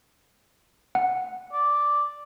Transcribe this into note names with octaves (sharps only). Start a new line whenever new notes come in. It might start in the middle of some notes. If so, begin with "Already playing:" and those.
F#5
D5